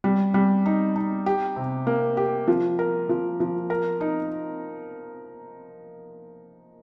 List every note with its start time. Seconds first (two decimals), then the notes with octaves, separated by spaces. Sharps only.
0.04 G3
0.34 G3
0.66 D#4
0.96 D#4
1.26 G4
1.56 C3
1.87 A#3
2.17 G4
2.48 F3
2.79 A#4
3.09 F3
3.40 F3
3.70 A#4
4.01 D#4